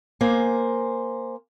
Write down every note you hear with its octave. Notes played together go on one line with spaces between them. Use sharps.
A#3 C5 G#5